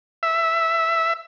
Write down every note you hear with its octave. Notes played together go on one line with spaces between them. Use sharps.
E5